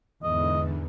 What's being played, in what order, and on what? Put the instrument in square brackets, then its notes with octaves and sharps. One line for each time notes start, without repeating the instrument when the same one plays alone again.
[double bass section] E2 [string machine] G#2 D3 [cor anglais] D#5